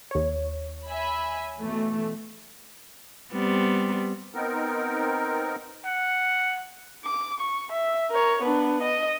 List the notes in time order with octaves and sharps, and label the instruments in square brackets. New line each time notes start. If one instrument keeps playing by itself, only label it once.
[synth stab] D#2 C#5
[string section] E5 G#5 B5
B2 E3 A3
[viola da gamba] G3 B3 C4
[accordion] B3 C4 D#4 A#4
[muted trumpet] F#5
[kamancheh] D6
C#6
E5
A#4 C#5
B3 D4
D#5